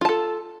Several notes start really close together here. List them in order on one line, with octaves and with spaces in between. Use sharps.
F4 A5 A4